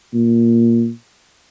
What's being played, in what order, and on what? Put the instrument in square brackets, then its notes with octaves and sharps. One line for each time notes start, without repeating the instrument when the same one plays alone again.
[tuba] A#2